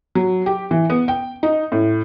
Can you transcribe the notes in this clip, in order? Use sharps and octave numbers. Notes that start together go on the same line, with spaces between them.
F#3
G4
E3
B3
G5
D#4
A2